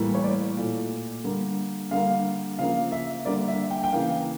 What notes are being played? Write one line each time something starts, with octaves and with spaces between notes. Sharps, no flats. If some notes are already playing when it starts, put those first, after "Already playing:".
Already playing: A2 E3 G3 A#3
C#5
D5
A#2 A3
D3 G3 A#3
D3 G3 A#3 F5
C#3 F3 A#3 F5
E5
D3 G3 A#3 D5
E5
G5
G5
C#3 E3 A#3 F5